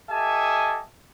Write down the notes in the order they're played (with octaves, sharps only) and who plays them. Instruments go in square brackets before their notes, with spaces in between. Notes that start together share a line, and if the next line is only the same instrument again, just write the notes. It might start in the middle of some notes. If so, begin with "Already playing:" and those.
[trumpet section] G4 A4 D#5 E5 G#5 A5